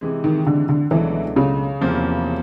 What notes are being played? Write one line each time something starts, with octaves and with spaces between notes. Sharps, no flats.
C3 E3 G#3
D#3
D3
D3
C#2 B2 E3 F#3 A3 D4
C#3
E2 C3 F3 A#3